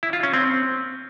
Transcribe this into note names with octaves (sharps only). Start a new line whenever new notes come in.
E4
F4
C#4
C4